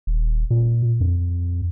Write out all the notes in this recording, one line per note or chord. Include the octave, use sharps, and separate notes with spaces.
D#1
A#2
F2